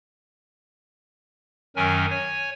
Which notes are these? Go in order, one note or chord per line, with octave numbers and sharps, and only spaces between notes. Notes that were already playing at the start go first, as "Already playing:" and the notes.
F#2 D#3 F#3 C#4 A#4 G#5
C#5 G#5